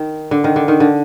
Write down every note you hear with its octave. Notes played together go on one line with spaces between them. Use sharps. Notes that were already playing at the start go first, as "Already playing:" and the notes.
Already playing: D#3
D3
D#3
D3
D#3
D3